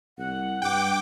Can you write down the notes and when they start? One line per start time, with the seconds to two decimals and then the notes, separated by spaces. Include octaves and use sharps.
0.18 C2 F#5
0.62 G2 G5 D6